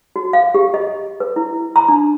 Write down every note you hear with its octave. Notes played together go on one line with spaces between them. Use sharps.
F#4
F5
G4
D#5
B4
E4
A#5
D4